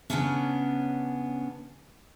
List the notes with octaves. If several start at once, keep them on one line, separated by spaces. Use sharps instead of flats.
C#3 A#3 B3 C#4 D4